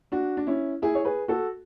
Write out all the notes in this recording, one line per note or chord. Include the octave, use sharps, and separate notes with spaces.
D4 F#4
D4
C#4 E4
E4 G#4
C#5
G#4 B4
F#4 A4